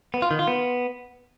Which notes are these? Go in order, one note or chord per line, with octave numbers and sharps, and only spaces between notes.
B3
F4
D#3
F4
B3